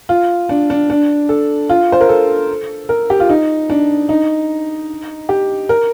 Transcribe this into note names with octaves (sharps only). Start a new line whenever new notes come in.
F4
D4
D4
D4
A4
F4
C5
A#4
A4
A#4
G4
F4
D#4
D4
D#4
G4
A#4